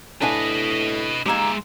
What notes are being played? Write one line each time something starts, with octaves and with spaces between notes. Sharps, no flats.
A2 D4 B4 D#5 F5 G#5
G#3 A#3 D#4 G4 E5